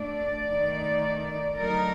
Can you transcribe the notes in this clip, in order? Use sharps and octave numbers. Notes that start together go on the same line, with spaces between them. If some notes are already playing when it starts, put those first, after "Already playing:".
Already playing: A2 A3 D4 D5
D#3 A3 D#4
D3 F#3 A3 D#4 A#4